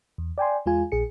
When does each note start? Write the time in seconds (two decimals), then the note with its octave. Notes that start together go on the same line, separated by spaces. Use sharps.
0.18 E2
0.38 D5 G5 G#5 C6
0.66 E2 G#3 F4 G#5
0.92 A#1 A#2 G#4 C#7